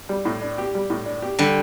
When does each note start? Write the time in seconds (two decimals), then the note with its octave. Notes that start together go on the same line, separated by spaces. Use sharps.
0.09 G3
0.25 A2
0.42 D4
0.58 G4
0.75 G3
0.90 A2
1.06 D4
1.22 G4
1.39 D3 G3